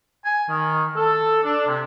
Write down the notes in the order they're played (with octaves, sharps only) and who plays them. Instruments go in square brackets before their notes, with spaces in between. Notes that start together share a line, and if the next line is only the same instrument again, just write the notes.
[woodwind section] G#5
D#3
A4
D4
C3